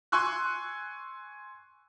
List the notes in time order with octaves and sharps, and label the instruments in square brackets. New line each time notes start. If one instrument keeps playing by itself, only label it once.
[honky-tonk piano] G#5 C6 C#6 E6 F#6